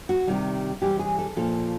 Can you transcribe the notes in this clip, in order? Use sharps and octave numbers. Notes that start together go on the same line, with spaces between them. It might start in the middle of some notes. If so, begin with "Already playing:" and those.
F#4
C3 D#3 G3
C3 E3 G3 G4
G#4
A4
A#2 F3 A4